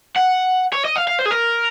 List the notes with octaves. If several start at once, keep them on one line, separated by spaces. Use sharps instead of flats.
F#5
C#5
D#5
F5
F5
C5
G#4
A#4